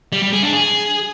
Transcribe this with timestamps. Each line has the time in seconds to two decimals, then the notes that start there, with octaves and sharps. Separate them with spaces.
0.12 G3
0.23 G3
0.33 G#4
0.43 D4
0.53 G#4